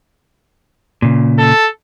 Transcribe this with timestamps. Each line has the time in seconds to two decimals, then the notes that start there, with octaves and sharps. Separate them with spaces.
1.02 A#2 C#3
1.38 A4